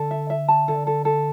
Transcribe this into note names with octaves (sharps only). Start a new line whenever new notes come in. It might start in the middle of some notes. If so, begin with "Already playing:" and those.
Already playing: D3 A4
E5
E5
A5
D3 A4
A4
A4